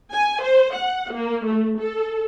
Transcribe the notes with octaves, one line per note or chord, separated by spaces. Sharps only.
G#5
C5
F#5
A#3
A3
A4